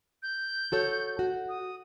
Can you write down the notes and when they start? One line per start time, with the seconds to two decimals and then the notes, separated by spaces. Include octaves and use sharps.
0.23 G6
0.72 F#4 A4 C#5
1.19 F#4
1.49 D#6